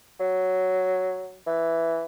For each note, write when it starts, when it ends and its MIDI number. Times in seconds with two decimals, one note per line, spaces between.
0.20 1.36 54
1.47 2.04 52